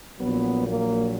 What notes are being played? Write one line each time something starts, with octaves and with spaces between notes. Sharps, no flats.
A#1 A#2 F#3 B3
A#3